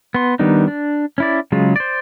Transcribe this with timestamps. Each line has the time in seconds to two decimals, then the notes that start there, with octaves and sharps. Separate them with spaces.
0.14 B3 C6
0.39 D#3 G3 B3 D4 D#4
0.68 D4
1.18 C#4 E4 D5
1.52 C#3 F#3 G#3 F4
1.76 C5 D5